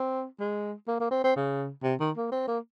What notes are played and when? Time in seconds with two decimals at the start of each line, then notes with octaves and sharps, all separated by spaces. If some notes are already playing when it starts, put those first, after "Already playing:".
Already playing: C4
0.40 G#3
0.88 A#3
1.00 A#3
1.11 C4
1.24 C4
1.36 C#3
1.83 C3
2.00 D#3
2.16 A#3
2.32 C4
2.48 A#3